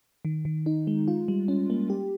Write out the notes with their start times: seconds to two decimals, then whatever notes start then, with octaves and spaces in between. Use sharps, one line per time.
0.25 D#3
0.45 D#3
0.66 D#4
0.87 G#3
1.08 F4
1.28 G3
1.48 C#4
1.70 A#3
1.90 G4